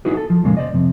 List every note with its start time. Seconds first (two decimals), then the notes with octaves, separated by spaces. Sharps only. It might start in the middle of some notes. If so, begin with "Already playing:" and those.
0.05 D#4 E4 F#4 G#4 B4
0.17 A4
0.30 F3
0.44 F2 A#2 C#3 G#3 A#3
0.57 C5 D5 D#5
0.74 F2 C3